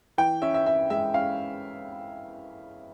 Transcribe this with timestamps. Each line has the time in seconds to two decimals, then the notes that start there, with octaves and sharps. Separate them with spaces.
0.18 E3 G5
0.42 C#4 E5
0.54 E5
0.66 C#4 E5
0.90 G#3 E5
1.14 C#4 F5